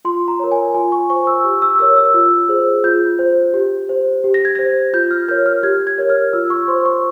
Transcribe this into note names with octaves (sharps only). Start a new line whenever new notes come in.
F4 C6
A#5
A#4 C#5
G#5
F4 G#5
C#6
C5 C#6
E6
G4 C#6
E6
A#4 C#5 E6
E6
F4
G#4 C5
F4 G6
C5
G4
C5
G4
A#6
G#6
C5 A#6
F4 G6
F6
A#4 C#5 G6
F6
G4 G#6
G#6
A#4 C#5
F6
F4 E6
C#6
C5 C6
C#6